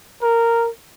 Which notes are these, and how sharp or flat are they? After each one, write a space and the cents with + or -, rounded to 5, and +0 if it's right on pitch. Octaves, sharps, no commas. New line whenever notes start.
A#4 -10